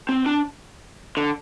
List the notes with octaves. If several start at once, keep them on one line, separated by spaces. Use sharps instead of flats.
C4
D4
D3